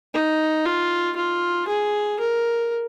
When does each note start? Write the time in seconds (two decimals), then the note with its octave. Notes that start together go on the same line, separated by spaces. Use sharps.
0.14 D#4
0.65 F4
1.16 F4
1.68 G#4
2.20 A#4